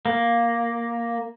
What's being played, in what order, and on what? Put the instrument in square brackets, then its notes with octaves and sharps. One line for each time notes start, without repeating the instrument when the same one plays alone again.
[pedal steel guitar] A#3